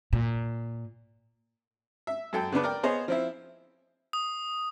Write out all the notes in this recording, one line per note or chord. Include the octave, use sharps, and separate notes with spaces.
A#2
E5
F#2 A4 G5
C#3 B3 D4 B4
A#4 D5 G5
B3 G#4 C5 C#5 D#5
F3 C4 E4
D#6